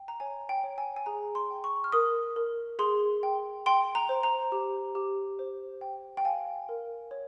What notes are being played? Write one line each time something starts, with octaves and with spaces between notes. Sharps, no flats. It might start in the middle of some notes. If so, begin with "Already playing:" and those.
Already playing: G5
A#5
C#5 G#5
G5
C#5
G#5
G#5
G#4 A#5
C6
G5
C#6
F6
A#4 D#6
A#4
G#4 C6
G5
G5 C6
A#5
C5
A#5
G4
G4
C5
G5
G5
F5 G#5
A#4
C#5